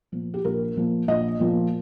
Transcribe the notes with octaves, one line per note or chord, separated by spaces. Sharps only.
A#2 F3 A#3
G4
A#1 A#4
A#2 F3 A#3
A#1 D#5
A#2 F3 A#3